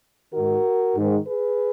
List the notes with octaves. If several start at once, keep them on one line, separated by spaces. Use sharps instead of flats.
G#2 D#3 F#4 A#4
G#2 D#3
G#4 B4